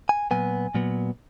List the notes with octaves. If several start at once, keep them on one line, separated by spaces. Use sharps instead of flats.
G#5
A#2 F#3 B3 G#5
A#2 F#3 B3